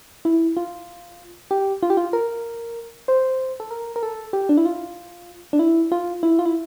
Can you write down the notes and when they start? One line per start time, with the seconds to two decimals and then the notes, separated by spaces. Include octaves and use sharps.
0.25 E4
0.57 F4
1.51 G4
1.83 F4
1.90 G4
1.97 F4
2.13 A#4
3.08 C5
3.60 A4
3.71 A#4
3.96 A#4
4.03 A4
4.33 G4
4.49 D4
4.57 E4
4.65 F4
5.53 D4
5.59 E4
5.92 F4
6.23 E4
6.39 F4
6.46 E4